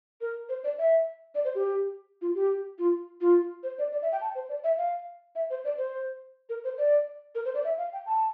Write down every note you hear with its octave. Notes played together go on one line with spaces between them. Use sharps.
A#4
C5
D5
E5
D5
C5
G4
F4
G4
F4
F4
C5
D5
D5
E5
G5
A5
C5
D5
E5
F5
E5
C5
D5
C5
A#4
C5
D5
A#4
C5
D5
E5
F5
G5
A5